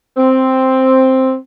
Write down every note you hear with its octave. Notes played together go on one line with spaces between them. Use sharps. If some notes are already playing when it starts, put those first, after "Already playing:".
C4